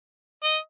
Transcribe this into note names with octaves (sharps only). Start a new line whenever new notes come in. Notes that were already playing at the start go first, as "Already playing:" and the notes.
D#5